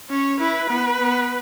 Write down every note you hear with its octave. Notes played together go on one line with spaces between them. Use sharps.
C#4 C#5
E4 B4
B3
B3